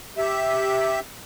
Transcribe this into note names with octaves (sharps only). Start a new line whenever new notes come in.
G4 E5